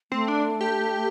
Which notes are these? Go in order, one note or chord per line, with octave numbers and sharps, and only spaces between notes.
A3 C4
D4
G4